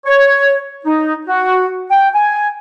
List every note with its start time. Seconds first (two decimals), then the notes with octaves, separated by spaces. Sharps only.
0.06 C#5
0.85 D#4
1.27 F#4
1.91 G5
2.15 G#5